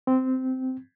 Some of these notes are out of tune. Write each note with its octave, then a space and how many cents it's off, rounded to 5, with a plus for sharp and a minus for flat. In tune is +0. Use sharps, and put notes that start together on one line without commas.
C4 -15